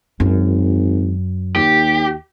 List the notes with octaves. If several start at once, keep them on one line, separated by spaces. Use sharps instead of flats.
G#1 F#2
D#2 G4